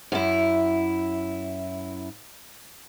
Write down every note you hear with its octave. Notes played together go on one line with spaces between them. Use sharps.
F#2 E4